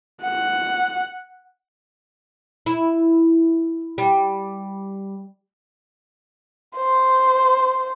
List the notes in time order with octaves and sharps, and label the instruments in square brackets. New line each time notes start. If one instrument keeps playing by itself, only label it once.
[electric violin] F#5
[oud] E4
G3
[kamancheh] C5